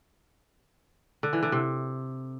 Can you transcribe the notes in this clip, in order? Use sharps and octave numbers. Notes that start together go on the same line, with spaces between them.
D3
E3
D3
C3